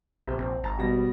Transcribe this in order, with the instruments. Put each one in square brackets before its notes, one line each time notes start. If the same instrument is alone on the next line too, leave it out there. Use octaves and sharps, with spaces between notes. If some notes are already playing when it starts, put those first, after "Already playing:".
[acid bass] A#1 [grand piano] C3
[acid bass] A#1 [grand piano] C4
[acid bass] G#1 [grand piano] A5 A#5
[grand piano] B2 G3 A#6